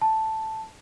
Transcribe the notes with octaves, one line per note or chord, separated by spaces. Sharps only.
A5